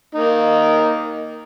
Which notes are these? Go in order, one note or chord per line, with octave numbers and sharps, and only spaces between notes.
A#3 D#4